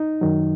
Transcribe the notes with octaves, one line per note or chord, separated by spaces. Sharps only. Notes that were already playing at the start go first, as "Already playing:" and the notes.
Already playing: D#4
F#2 D#3 F#3